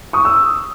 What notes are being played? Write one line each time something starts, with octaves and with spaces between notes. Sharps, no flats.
C#6 D#6
E6